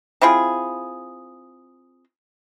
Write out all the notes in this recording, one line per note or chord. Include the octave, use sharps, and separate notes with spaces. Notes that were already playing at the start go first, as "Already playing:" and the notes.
C4 E4 F4 G#4